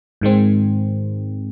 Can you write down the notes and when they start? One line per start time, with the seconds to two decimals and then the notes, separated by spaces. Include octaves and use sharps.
0.21 G#2 D#3 G#3 C4